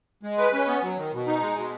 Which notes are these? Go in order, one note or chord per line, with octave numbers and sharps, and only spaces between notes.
G#3
B4
C#4
B3
F#3
D#3
B2
D#4
G#3
B2